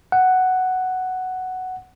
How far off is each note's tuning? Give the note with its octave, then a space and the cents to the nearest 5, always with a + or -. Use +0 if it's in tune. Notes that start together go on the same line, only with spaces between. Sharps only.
F#5 +5